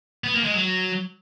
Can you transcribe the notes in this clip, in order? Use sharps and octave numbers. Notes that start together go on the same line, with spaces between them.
B3
A#3
G#3
F#3